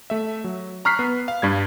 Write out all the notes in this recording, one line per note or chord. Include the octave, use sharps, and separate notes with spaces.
A3 E5
F#3
A#5 C#6 F6 F#6 B6 C7
B3
F5
G2 G3 G#6